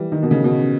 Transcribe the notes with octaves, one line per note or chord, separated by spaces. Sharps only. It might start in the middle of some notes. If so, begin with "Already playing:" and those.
Already playing: E3 G3
D#3
B2
C#3
B2